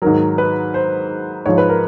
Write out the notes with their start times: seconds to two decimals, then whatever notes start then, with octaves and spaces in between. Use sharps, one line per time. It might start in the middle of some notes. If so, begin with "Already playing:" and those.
0.02 G#2 D#3 F#3 A#4
0.38 B4
0.74 C5
1.46 G#2 F3 C#5
1.58 B4
1.69 A#4